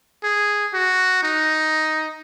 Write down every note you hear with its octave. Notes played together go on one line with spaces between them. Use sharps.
G#4
F#4
D#4